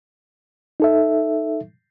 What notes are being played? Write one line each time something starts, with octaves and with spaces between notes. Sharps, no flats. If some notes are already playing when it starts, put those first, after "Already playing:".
D#4 A4 E5